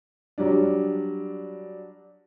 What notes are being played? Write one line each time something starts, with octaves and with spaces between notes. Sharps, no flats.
F#3 G3 D4